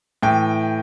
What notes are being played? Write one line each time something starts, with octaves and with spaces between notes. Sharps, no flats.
A2 E3 G5